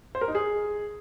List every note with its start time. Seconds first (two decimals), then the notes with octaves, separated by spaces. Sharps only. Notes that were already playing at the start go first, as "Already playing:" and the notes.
0.15 C5
0.21 A#4
0.28 D#4
0.35 G#4